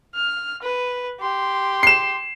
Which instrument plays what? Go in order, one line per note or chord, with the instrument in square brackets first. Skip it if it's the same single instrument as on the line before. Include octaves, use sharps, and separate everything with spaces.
[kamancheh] F6
B4
G4 C6
[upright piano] C7 E7